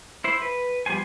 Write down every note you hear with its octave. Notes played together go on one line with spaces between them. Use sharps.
E4 C5
B4
F3 G3 B3 C5 G#5